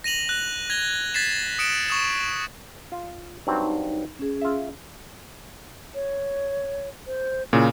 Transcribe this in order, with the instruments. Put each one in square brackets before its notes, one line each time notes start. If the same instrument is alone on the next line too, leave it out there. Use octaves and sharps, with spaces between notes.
[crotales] A#6 D#7 F7 F#7
F#6
G#6 A#6 F7 G7
G#6 A6 B6 C7 E7
D#6 C#7 D7 E7
C#6 D#6 E7
[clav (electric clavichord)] F4
[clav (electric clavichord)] G2 F#3 C4 [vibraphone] D#4
[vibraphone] C#4 G#4
[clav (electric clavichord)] F4 E5
[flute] C#5
C5
[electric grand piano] A#2 C#3 [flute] E4